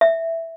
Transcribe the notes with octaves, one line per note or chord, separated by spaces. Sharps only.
E5